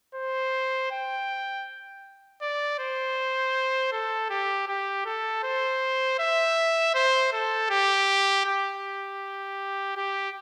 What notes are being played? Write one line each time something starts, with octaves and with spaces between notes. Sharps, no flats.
C5
G5
D5
C5
A4
G4
G4
A4
C5
E5
C5
A4
G4
G4
G4